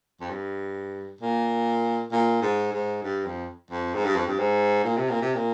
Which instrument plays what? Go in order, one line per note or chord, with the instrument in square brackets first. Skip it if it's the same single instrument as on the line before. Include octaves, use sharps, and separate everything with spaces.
[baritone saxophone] F2
G2
A#2
A#2
G#2
G#2
G2
F2
F2
G#2
G2
F2
G2
G#2
A#2
C3
A#2
C3
A#2